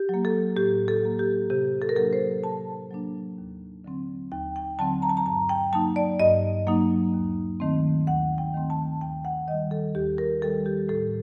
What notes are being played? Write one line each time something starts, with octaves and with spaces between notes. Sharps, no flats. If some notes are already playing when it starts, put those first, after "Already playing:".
Already playing: G4
F#3 A#3
A4
A2 G4
A4
F#3 A#3
G4
C3 G4
A4
A#4
F#3 A#3 D4 A4
C5
C3 A5
F#3 A#3 D4
D#2
D3 F#3 C4
D#2 G5
G5
D3 F#3 C4 A5
A#5
A5
A#5
G2 A5
G5
F#3 A#3 D#4 A5
D5
G2 D#5
F#3 A#3 D#4
D#2
D#3 A3 C4
D#2 F#5
G5
D#3 A3 C4
A5
D#2 G5
F#5
D#3 G3 D#5
A4
D#2 G4
A#4
D#3 G3 A4
G4
A2 A4